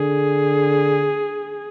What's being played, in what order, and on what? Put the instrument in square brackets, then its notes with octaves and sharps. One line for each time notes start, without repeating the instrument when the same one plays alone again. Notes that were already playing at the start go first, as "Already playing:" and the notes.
Already playing: [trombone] D3 [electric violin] G#4